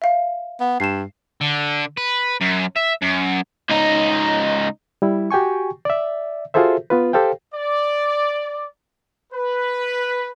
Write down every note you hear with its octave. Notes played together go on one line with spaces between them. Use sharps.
E5 F5
B3
G2 C7 E7
D3
B4
F#2
E5
F#2
C#2 D#4
G3 E4
F#4 G4 G5 G#5 C#6
D5 E5
F4 F#4 G#4 A4 C5 E5
B3 F4 B4
G4 A4 C5 F5 G5
D5
B4